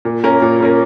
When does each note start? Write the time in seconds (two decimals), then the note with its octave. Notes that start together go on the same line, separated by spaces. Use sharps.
0.05 A#2
0.24 A#3 C#4 A#4
0.42 A#2
0.60 A#3 C#4 A#4